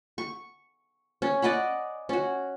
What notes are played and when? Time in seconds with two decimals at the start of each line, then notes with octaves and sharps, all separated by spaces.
0.18 C#6
1.22 C#4
1.42 D5 D#5 F#5 B5
2.09 C#4 F#4